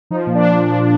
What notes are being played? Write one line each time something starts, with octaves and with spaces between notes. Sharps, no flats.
F3 D#4
A#2
D4